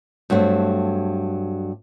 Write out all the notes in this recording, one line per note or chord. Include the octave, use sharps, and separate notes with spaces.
G2 F#3 A3 C4